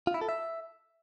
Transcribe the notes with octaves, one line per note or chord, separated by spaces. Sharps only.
F4
E4
A4
E5